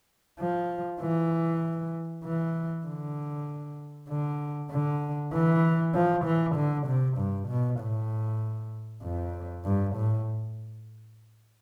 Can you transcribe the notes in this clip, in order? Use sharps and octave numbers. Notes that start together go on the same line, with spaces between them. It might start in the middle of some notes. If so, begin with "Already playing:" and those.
F3
E3
E3
D3
D3
D3
E3
F3
E3
D3
C3
G2
B2
A2
F2
G2
A2